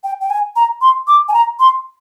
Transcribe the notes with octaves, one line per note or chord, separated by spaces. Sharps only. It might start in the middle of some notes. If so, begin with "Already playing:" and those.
G5
G5
G#5
A#5
C6
D6
G#5
A#5
C6